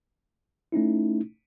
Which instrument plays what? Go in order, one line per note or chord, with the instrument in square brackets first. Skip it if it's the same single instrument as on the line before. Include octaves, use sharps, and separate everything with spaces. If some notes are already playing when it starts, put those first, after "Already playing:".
[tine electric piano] A3 C#4 D#4 E4